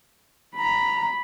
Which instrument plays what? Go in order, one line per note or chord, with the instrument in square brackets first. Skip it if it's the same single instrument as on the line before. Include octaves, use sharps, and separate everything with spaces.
[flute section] A#5 [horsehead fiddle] B5